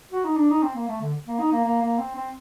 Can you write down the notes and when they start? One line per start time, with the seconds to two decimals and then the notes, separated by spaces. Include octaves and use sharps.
0.11 F#4
0.24 D#4
0.37 D4
0.50 D#4
0.63 C4
0.75 A#3
0.88 A3
1.01 D3
1.27 A#3
1.39 D#4
1.52 A#3
1.64 A#3
1.82 A#3
1.99 C4
2.15 C4